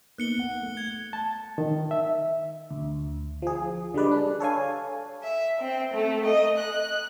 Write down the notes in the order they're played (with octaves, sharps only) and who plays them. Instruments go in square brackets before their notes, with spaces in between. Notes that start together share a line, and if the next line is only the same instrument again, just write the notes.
[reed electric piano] A#3 B3 D#4 [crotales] F#6 C#7 G7
[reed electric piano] F#5
A3
[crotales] G#6
[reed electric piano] A5
D#3
E5
[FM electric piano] D2
F3 G#4
D3 G3 G#3 B4 D5
D4
A4 C#5 F5 G#5
[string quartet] E5
C4
A3
D#5
F#6